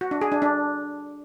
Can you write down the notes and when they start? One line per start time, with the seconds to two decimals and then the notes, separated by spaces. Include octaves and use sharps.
0.01 F#4
0.11 D4
0.21 G#4
0.32 D4
0.42 D4